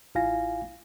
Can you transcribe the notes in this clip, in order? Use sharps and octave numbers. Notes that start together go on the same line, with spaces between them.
A1 E4 F4 F5 G#5 A#6